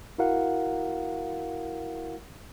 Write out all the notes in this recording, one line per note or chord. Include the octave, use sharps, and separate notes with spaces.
E4 F#4 A#4 F5 F#5